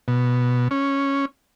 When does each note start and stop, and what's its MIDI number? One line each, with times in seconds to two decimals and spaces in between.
0.08 0.68 47
0.71 1.25 61